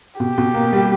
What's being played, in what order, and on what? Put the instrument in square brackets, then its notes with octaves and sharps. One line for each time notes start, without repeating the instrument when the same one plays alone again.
[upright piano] B2 [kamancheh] G4
[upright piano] B2
A#3
G3